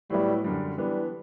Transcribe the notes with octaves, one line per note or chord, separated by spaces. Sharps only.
A2 F#3 G3 B3 E4
F#2 D3 G3
E3 G3 B3 D4